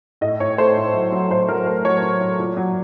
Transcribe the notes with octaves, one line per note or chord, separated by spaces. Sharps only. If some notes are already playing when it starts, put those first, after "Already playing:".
A2 D#5
A2 C#5
A3 C5
A2
F#3
F#3
A2 C5
F#3 A#4
A3 C5
F#3 C#5
F#3
F#3
A#2
F#3